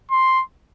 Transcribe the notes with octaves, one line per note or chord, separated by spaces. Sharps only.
C6